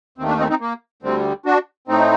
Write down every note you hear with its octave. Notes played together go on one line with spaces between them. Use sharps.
D#2 D#3 A3 C4
A#3 D4
C4 D#4
C4 D#4
A#3
D2 D3 G3 C4
D4 F#4
A2 A3 C4 D#4